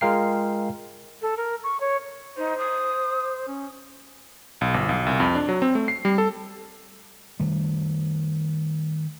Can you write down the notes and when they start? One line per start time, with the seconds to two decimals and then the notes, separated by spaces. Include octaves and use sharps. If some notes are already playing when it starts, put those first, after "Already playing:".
0.01 G#3 F4 A#4 F5 G5 C7
1.22 A4
1.37 A#4
1.63 C#6
1.80 C#5
2.38 D#4 C5
2.58 D#6
3.48 C#4
4.61 B1
4.74 G1
4.89 B1
5.07 C2
5.20 F2
5.35 D4
5.49 F#3
5.62 C4
5.75 A3
5.88 C7
6.05 G3
6.18 A4
7.40 D#3 G3 A3